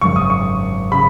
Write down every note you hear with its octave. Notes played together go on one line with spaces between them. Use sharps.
G#1 F#2 C#3 C#6
D#6
C#6
C#3 B5